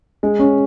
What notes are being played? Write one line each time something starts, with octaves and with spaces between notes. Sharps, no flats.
G#3
C#4